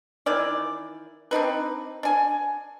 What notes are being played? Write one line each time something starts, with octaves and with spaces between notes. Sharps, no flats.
D#3 E3 D5
C4 D4 D#4 B4
D4 G#5